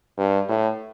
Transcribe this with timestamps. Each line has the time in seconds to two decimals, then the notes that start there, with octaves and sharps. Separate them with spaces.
0.18 G2
0.48 A2